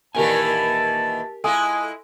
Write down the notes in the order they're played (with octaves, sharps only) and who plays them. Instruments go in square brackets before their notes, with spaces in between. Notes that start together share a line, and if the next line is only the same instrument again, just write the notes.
[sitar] A#2 D#3 E3 [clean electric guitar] G4 A#4 G#5 [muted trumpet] A5
[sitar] G#3 E4 F4 [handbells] A4 G#5 D#6